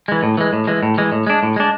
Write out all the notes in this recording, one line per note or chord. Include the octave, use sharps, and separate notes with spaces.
E3 G#3
A2
E3 G#3
A2
E3 G#3
A2
E3 G#3
A2
G#3 D4
A2
G#3 D4